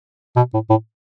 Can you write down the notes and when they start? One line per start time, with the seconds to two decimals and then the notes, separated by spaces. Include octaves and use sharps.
0.37 B2
0.54 A2
0.70 A2